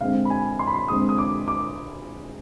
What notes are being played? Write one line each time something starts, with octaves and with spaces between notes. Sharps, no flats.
D3 G#3 C4 F5
B5
G#5
C6
B5
C6
D3 G#3 C4 D#6
D#6
D6
D6